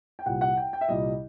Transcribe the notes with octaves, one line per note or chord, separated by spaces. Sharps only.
G5
C2 A#2 G3 F#5
F#5
G5
G5
E5
C2 A#2 G3 D#5